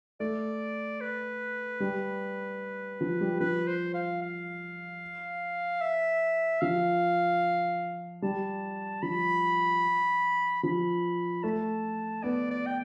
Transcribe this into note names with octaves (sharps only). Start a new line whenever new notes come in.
A3 D5
B4
G3
F3
G3
F3 B4
C5
F5
F5
E5
F3 F5
G3 A5
F3 B5
F3 B5
A3 A5
B3 D5
D5
G5